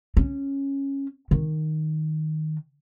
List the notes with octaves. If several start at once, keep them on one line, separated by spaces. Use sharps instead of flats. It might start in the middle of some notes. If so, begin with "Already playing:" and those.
C#4
D#3